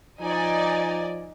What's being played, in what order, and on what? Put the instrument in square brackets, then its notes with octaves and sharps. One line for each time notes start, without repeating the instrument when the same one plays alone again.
[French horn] F3 [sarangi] D#4 [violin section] D5 D#5 G#5